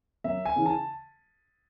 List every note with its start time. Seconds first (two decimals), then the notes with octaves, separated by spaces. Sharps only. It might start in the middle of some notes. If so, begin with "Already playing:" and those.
0.24 F#2 E5
0.45 G#5
0.56 C#3 E3
0.66 A5